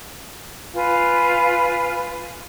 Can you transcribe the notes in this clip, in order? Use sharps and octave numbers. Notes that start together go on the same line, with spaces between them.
F4 B4 F5 G#5